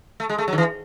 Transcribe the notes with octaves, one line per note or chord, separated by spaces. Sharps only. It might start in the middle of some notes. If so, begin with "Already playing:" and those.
A3
G#3
A3
F#3
D#3
E3